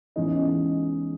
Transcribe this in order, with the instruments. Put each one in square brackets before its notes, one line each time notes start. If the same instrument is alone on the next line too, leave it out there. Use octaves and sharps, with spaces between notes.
[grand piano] E2 C#3 E3 G#3 C#4 D#4